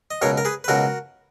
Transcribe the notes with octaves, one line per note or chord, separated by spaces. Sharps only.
D#5
C#2 B2 F#3 A#4 C#5
A#4
G#4 B4
B4
C#2 B2 F#3 F#4 A#4